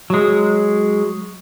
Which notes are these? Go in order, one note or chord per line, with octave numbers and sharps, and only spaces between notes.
F#3 G#3